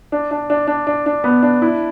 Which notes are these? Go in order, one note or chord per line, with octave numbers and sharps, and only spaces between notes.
D4
D4
D4
D4
D4
D4
B3
D4
E4